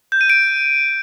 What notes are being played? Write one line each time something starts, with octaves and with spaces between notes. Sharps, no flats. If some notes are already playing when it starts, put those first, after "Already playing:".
G6
D#7
D7